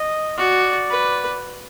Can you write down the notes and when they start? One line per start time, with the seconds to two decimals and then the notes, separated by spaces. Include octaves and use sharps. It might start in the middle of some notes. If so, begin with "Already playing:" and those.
Already playing: D#5
0.38 F#4 D5
0.90 B4